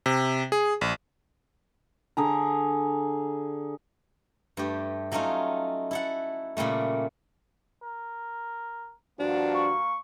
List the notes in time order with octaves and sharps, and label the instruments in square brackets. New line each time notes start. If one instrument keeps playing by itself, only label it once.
[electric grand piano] C3
G#4
A#1
[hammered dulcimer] D3 G#4 A#5
[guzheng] G2 A3 G4
F#3 A3 C#4 D#4 F4
E4 A4 F#5
A#2 C#3 G3 A3
[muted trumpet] A#4
[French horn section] G2 F3 F#4 [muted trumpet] A#3 [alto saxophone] D4
[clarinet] C#6